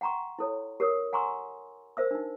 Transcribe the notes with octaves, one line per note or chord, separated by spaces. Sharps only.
F#5 G5 A#5 C6 C#6
E4 A4 C#5
G4 A#4 C#5 D#6
F#5 G#5 A#5 C6 C#6 E6
A#4 C5 E5 E6
D4 D#4